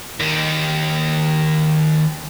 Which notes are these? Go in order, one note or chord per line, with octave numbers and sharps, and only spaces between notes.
D#2 D#3